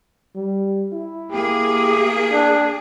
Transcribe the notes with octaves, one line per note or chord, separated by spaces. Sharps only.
G3
E4
A#3 G4 G#4
D4